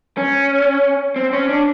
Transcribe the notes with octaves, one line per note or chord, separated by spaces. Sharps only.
C#4
C4
C#4
D4